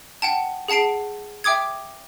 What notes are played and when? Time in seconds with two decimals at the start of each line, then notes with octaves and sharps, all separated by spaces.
0.22 F#5 G5 A5
0.68 G#4 F#5 A5 C7 D7
1.44 E5 G5 D6 D#6 G#6